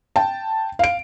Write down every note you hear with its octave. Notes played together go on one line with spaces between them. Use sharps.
G5 A5
F5 D7